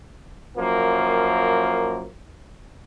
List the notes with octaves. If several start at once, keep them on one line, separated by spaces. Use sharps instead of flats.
F#2 F3 A#3